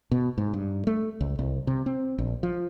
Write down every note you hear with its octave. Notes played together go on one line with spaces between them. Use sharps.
B2
G#2
G2
A3
C#2
C2
C3
C4
A#1
F3